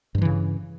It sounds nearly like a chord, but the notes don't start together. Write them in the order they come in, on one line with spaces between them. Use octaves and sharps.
G2 F3 E3 C#3